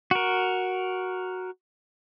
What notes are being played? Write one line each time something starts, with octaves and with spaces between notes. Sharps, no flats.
F#4 A#4